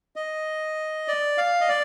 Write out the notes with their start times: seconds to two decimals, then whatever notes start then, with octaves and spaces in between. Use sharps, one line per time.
0.16 D#5
1.08 D5
1.38 F5
1.61 D#5
1.69 D5